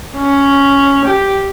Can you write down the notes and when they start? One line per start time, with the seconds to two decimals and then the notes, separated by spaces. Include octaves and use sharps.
0.16 C#4
1.05 G4